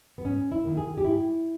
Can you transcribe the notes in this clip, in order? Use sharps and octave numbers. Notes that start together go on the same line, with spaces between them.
B3
G#2 C#4
E4
D#3 A#3
G#4
G4
G#2 E4